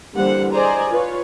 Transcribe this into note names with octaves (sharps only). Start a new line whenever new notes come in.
D3 E3 G3 A#3 C5 F#5
G#4 C5 D5 D#5 G#5 A#5
F4 B4 C#5